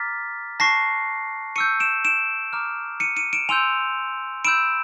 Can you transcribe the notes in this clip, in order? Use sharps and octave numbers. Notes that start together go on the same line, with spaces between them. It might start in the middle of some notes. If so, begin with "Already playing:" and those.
Already playing: A#5 D6 F6 A6 B6
A5 C#6 F#6 A#6 C7
C#6 E6 G6 C#7 D#7
D7 E7
D7 E7
A#5 D6 F6
C#7 D#7
C#7 D#7
D7 E7
G#5 C6 E6 G6 D#7 F7
B5 E6 G6 D7 E7